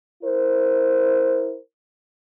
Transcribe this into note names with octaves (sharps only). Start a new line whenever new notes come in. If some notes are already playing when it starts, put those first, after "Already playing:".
E4 A#4 C5